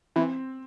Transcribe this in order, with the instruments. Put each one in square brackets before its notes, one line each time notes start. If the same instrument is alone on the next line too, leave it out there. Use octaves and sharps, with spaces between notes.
[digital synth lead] E3 [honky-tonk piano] C4